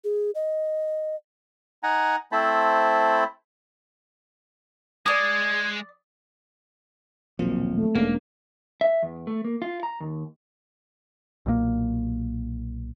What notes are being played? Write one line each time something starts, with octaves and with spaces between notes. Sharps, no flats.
G#4
D#5
D#4 F#5 G#5 A#5
A3 C4 E4 C5 A5 B5
G#3 D5 D#6 G#6
D#1 B1 F3 F#3 A#3 C4
A3
E1 G#3 A#3 C#4 D4
E5
E2
A3
A#3
F4
A#5
D#2
B1 A#2 D#3 A#3